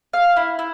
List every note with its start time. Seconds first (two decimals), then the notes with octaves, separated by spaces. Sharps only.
0.13 F5
0.36 E4
0.59 E4